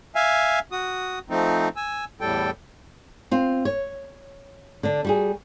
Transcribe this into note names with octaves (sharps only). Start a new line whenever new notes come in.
E5 F5 G#5
F#4 D#6
F3 A3 C4 D#4
G#5 E6
E2 A2 G3 A4 G5
C4 F4
C#5
D3 D4
G3 F#4 G#4